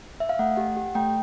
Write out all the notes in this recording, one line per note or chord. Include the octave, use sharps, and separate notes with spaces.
E5
F5
A3 F#5
G4
G4
A3 G5